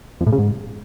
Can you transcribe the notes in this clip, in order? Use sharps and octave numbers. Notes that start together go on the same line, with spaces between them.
F2
A2
C#3
G#2